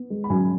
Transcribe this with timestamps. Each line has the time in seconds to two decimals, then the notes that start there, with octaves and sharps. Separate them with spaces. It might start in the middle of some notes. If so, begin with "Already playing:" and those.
Already playing: B3
0.10 G#3
0.24 B5
0.30 F#2 G#5